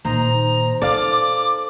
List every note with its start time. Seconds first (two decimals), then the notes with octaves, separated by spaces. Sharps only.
0.05 A#2 D#3 D#4 C5 A#5
0.82 D#4 A4 D5 F5 D6